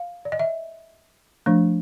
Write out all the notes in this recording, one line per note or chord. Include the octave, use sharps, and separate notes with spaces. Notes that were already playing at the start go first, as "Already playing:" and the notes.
Already playing: F5
D5
D#5
E5
F3 A3 D4